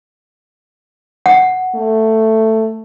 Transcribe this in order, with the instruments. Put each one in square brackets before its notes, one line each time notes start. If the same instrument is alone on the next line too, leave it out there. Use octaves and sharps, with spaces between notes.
[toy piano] F#5
[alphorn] A3